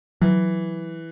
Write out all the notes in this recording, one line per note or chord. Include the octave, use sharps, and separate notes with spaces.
E3 F#3